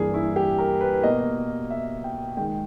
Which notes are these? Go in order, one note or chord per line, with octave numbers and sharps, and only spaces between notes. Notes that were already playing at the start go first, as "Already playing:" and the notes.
Already playing: G2 E3 A#3 G#4
E4
G4
A#4
B4
B2 A#3 D#5
E5
G5
D#3 G#3 G5